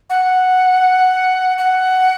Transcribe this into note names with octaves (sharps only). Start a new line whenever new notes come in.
F#5
F#5